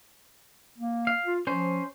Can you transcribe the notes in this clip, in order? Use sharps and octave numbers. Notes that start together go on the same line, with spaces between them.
A#3
F5
F4
F3 C#4 C5